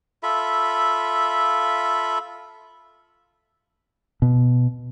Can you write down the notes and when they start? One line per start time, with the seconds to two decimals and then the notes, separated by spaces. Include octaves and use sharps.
0.23 F4 A4 E5 B5
4.22 B2